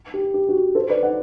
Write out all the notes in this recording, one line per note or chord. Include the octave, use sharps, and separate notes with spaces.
G4
G4
F#4
A4 C5
B4 D5
D5 F#5